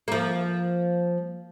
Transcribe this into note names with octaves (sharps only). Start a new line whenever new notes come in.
F3 A#3